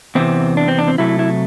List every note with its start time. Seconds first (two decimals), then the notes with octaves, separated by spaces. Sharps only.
0.15 E2 C3 E3 C4
0.57 D4
0.68 C4
0.79 D4
0.88 C4
0.98 C3 F#3 A3 E4
1.19 E4